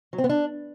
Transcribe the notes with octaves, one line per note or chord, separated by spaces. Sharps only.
F#3
C4
B3
D4